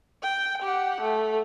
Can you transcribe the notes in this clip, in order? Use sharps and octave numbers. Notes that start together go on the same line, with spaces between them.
G5
G4 F#5
A3